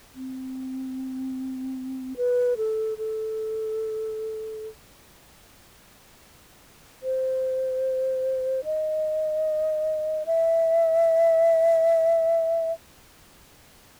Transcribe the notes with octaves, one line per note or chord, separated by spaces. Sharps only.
C4
B4
A4
A4
C5
D#5
E5